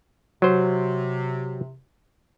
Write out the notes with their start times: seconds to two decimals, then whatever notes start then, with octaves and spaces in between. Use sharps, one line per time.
0.42 C3 F#3 C5